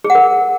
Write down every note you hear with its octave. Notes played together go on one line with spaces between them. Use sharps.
G#4
F#5
A#4